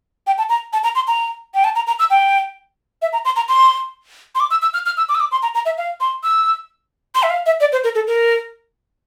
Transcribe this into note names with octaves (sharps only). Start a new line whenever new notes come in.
G5
A5
A#5
A5
A#5
C6
A#5
G5
A5
A#5
A#5
E6
G5
E5
A#5
C6
A#5
C6
C6
D6
E6
E6
F6
F6
E6
D6
E6
D6
C6
A#5
A#5
E5
F5
C6
E6
C6
E5
F5
E5
D5
C5
A#4
A4
A#4